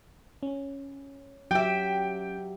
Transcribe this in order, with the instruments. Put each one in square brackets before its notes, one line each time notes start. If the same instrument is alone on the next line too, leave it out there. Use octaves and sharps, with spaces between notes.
[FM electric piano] C#4
[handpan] F#3 [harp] G4 E5 [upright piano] G5